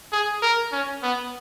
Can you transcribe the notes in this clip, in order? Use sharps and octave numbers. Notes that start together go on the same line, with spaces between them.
G#4
A#4
C#4
B3